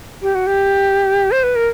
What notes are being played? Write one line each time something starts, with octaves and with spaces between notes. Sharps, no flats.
G4
F#4
G4
C5
B4
A#4